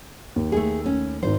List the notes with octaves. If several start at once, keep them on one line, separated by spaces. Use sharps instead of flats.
D#2
A3 G#4
C#4
G#1 D#3 C5